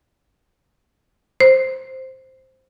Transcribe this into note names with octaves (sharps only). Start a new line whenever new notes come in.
C5